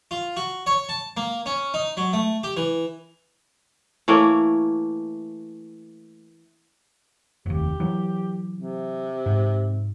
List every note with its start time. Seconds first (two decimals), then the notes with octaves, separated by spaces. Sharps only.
0.11 F4
0.37 F#4
0.66 C#5
0.89 A5
1.17 A#3
1.46 C#4
1.74 D#4
1.97 F#3
2.13 A3
2.43 G4
2.57 E3
4.08 E3 A3 A#3 C#5
7.46 F1 D#2 G4
7.80 E3 F#3
8.54 C3
9.26 G#2